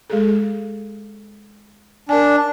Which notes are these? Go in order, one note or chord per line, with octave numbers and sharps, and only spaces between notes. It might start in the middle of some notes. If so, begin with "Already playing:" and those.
G#3 G#4 A4
D4 A#4 G#5